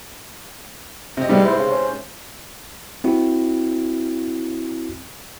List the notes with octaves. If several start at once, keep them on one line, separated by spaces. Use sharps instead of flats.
C3 D#5
G#2 C3 G3 B3
E4 C5
C#3
C#4
C4 E4 F#4